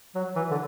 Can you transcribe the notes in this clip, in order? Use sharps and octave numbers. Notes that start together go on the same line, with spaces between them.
F#3
E3
D3